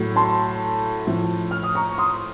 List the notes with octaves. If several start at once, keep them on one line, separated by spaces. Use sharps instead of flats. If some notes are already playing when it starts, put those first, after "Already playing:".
Already playing: A2 F#3 A3
A5 C6
A2 F3 A3
F6
D#6
A#5 C#6
C6 D#6